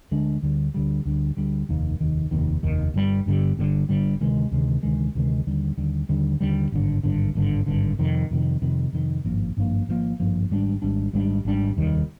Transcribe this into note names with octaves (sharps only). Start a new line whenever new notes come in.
D2 D3 G#3 D4
D2 D3 G3
D2 D3 G3
D2 D3 G3
D2 D3 G3
F1 D#2 D#3
F1 D#2 D#3
F1 D#2 D#3
F1 D#2 D#3
G1 G2 D3 G3
G1 G2 D3 G3
G1 G2 D3 G3
G1 G2 D3 G3
D2 C3 D#3 G#3
D2 C3 D#3 G#3
D2 C3 D#3 G#3
D2 C3 D#3 G#3
D#2 D3 G3
D#2 D3 G3
D#2 D3 G3
D#2 D3 G3
G#1 G2 D3
G#1 G2 D3
G#1 G2 D3
G#1 G2 D3
F2 C3 D#3
F2 C3 D#3
F2 C3 D#3
F2 C3 D#3
G#1 G2 F3 A#3
G#1 G2 F3 A#3
G#1 G2 F3 A#3
G#1 G2 F3 A#3
G#1 G#2 G3 D4
G#1 G#2 G3 D4
G#1 G#2 G3 D4
G#1 G#2 G3 D4
F1 D#2 D#3 G3